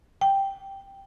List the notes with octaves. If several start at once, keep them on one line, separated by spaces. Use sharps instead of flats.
G5